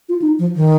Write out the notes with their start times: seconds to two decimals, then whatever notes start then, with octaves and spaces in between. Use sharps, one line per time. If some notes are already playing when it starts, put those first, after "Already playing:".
0.09 F4
0.22 D#4
0.39 F3
0.56 D#3